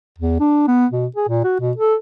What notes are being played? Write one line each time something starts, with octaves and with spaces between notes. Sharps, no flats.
E2
D4
B3
B2
G#4
A#2
F#4
B2
A4